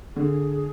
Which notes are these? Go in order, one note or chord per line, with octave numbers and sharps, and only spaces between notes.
D3 G#4